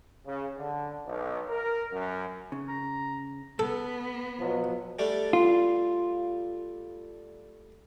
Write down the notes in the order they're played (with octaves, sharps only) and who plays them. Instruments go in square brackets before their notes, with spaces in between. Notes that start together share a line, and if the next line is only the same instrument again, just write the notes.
[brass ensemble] C#3
D3
B1
A#4
F#2
[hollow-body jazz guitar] C#3
[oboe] A#5
[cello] B3 [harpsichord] A4
[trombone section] B2 F3 F#3
[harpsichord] G3 A3 D4
[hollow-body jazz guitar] F4